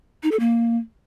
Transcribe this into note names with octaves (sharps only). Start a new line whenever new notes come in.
D#4
A4
A#3